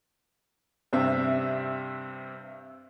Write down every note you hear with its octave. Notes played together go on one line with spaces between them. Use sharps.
G2 C3 C4 E5